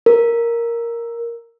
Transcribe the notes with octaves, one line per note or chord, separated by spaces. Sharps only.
A#4